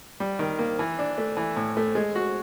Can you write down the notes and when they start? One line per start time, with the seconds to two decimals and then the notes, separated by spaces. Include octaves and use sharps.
0.20 G3
0.39 D#3
0.59 A#3
0.79 E3
0.99 D4
1.18 A3
1.37 E3
1.57 A2
1.77 A3
1.95 G#3
2.16 F#4